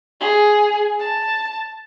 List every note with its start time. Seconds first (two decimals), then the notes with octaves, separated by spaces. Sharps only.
0.20 G#4
0.99 A5